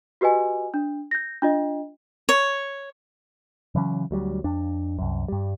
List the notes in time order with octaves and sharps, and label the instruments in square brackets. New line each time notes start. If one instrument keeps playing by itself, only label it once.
[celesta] F#4 G4 B4 D#5 G#5
D4
G6 A#6
D4 F4 D#5
[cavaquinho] C#5
[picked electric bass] C#3 E3 F#3 C#4
D2 F#3 G3
F2 D4
C2 F#2
G2 G3